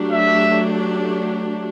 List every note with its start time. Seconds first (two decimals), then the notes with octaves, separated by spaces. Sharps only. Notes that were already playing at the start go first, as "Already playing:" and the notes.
Already playing: F#3 A3 D4 G4
0.11 E5